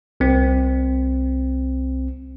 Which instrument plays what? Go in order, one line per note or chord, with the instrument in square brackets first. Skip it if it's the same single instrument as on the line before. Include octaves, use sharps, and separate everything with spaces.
[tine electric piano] C2 C4